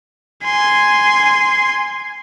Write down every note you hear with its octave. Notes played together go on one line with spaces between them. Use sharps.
G#5 C6